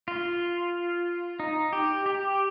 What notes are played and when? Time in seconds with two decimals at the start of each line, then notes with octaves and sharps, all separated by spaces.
0.08 F4
1.40 D#4
1.73 G4
2.06 G4